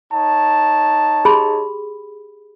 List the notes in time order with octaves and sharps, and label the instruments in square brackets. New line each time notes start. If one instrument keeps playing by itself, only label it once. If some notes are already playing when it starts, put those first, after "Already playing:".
[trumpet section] D#4 C#5 A5
[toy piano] G4 G#4 B5